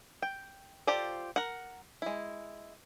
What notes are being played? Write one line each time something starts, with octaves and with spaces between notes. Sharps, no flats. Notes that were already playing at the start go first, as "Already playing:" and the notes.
G5
F4 G4 A4 C5 D5
A#4 F#5
G#3 E4